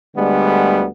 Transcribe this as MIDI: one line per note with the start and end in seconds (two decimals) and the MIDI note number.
0.15 0.84 38
0.15 0.84 50
0.15 0.84 55
0.15 0.84 56
0.15 0.84 59